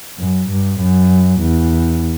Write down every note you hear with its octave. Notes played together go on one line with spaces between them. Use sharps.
F#2
G2
F#2
E2